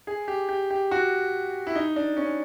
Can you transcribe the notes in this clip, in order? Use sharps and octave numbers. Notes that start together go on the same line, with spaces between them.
G#4
G4
G4
G4
F#4
E4
D#4
D4
C#4